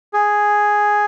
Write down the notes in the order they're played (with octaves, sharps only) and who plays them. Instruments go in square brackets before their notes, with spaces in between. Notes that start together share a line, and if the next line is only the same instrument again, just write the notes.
[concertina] G#4